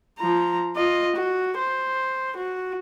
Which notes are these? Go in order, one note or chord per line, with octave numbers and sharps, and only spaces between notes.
F3 A#5
F4 D#5
F#4
C5
F#4